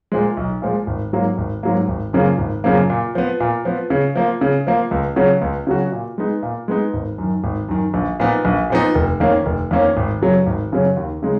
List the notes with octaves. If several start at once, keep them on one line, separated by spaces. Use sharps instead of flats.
A#2 F3 G#3
B1
A#2 F3 G#3
G#1
G#2 F#3 A#3
G#1
G#2 F#3 A#3
G#1
F#2 C#3 F3 A#3
G#1
F#2 C#3 F3 A#3
A#2
F3 B3
A#2
F3 B3
C#3
F3 A#3
C#3
F3 A#3
C#2
C#3 F#3 C#4 F#4
C#2
C#3 F#3 C#4 F#4
A#2
G#3 B3 D#4
A#2
G#3 B3 D#4
G#1
F#2 D#3
G#1
F#2 D#3
A#1
A#2 F3 B3 D#4
A#1
A#2 F3 B3 D#4
F1
F2 D#3 A#3 C#4
F1
F2 D#3 A#3 C#4
G#1
F#2 C#3 F#3 C#4
G#1
F#2 C#3 F#3 C#4
D#2
C#3 G#3 D#4